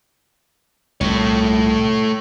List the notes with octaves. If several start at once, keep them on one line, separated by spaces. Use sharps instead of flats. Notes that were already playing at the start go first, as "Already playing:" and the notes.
C2 A#2 A3 C#5